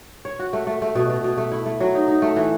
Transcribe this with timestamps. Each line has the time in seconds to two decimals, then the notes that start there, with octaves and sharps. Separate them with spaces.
0.25 C#5
0.39 F#4
0.53 A3
0.67 A3
0.82 A3
0.95 B2
1.10 B2
1.24 B2
1.38 A3
1.51 E4
1.66 A3
1.80 F#3
1.95 D#4
2.08 D#4
2.22 A3
2.36 E3